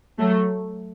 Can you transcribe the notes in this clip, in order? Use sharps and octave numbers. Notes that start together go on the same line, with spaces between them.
F#3 A3